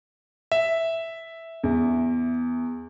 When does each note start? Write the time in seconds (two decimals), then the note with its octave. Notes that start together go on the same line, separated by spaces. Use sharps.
0.52 E5
1.63 E2